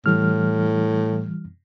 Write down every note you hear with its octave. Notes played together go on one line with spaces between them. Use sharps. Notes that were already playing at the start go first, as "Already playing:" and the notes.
A2 E3 G3 F6